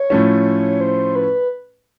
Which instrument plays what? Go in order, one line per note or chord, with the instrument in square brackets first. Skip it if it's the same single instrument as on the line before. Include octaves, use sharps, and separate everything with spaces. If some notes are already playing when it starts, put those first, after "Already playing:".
Already playing: [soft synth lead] C#5
[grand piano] A2 F3 A3 C#4
[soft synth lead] C5
B4